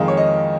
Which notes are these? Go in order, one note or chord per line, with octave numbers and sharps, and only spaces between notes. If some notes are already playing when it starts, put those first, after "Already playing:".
Already playing: F2 D#3 G#3 F5
C#5
D#5